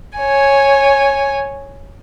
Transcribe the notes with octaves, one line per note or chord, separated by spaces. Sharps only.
C#5 G#5